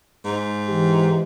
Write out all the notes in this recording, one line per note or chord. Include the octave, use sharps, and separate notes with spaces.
G#2
E3 G4